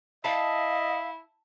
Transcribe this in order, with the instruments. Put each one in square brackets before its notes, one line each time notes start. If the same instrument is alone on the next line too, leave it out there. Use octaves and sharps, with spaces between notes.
[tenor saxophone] E4 [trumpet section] D#5 [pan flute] F5 [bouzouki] A5